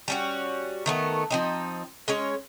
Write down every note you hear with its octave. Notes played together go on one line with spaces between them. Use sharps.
G3 C#4 F#4
D#3 A3 B3
F3 C4 D#4
G#3 C#4 C#5